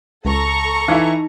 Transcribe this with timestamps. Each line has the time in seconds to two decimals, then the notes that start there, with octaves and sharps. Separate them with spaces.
0.25 C#2 A4 A#5 C#6
0.88 E3 D#4 E4